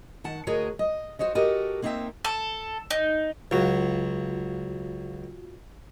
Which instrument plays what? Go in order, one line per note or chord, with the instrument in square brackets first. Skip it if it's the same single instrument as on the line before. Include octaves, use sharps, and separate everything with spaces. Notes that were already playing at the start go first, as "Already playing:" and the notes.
[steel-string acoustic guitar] D#3 F#5 A5
D2 F#4 G#4 A#4 C#5 D#5
D#5
F#4 C5 C#5 D#5
F#4 G4 A4 A#4 D#5
A#3 C4 D#4 C5 E5 G5
[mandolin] A4
D#4
[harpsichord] C#2 F#3 [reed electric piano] F4 F#4